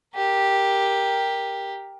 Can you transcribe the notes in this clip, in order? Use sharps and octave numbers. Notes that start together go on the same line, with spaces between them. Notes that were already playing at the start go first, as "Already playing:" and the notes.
G4 A#4